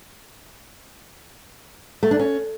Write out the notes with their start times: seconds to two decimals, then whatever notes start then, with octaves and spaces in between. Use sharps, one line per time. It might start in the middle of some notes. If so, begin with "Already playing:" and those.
2.03 A3
2.11 D4
2.19 C#4